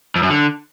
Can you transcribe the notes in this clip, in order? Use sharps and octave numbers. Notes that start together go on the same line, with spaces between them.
F2
F#2
D3